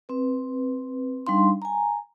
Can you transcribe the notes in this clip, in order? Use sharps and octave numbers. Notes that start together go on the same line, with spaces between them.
C4 B4
G3 D4 D#4 F5 C6
G#5 A#5